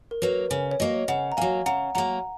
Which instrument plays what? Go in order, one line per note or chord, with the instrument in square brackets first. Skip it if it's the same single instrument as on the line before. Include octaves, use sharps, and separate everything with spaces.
[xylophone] A#4
[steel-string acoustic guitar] F#3 A#3 [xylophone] B4
[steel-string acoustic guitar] C#3 [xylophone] C#5
[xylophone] C#5
[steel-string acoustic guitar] F#3 A#3 [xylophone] D#5
[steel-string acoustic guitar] C#3 [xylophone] F#5
[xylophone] A#5
[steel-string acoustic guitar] F#3 A#3 [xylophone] F5 G#5
[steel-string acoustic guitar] C#3 [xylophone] F#5 A#5
[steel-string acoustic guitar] F#3 A#3 [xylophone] F#5 A#5